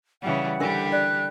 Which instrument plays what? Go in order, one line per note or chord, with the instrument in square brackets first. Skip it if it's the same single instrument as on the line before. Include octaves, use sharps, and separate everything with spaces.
[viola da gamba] C#3 E3 G3 [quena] F#5
[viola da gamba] D3 G3 G4 [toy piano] D4 A#4 E5
[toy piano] D5 [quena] F#6